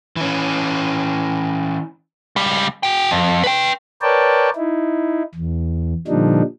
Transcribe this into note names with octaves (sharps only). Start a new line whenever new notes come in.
E3 C#4
C#2 G3
F#4 G5
F2
B4 G5
A#4 B4 C#5 D5 G5 A5
D#4 E4
E2
A#2 D3 F3 G3 D4 D#4